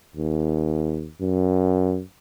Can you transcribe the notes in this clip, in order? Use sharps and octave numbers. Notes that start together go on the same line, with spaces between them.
D#2
F#2